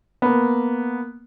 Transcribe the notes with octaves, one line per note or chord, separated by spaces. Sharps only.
A#3 B3